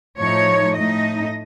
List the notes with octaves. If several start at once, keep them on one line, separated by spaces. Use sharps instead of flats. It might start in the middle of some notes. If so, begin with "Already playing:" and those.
A2 F3 A3 D#4 C#5
A2 A3 D#4 D#5